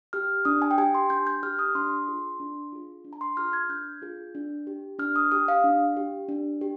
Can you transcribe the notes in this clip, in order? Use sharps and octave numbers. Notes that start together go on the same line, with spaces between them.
G4 F6
D4 D#6
G#5
G5
G4 G#5
C6
D4 G6
G6
G4 F6
D#6
D4 C6
F4 G#4
D4
F4 G#4
D4
A#5
C6
F4 G#4 F6
G#6
D4 G6
F4 G#4
D4
G4
D4 F6
D#6
G4 D#6
F5
D4
G4
D4
G4